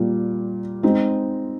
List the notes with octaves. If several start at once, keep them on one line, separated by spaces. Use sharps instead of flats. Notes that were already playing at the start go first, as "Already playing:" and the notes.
Already playing: A#2 G3 A#3
G#3 C4 D#4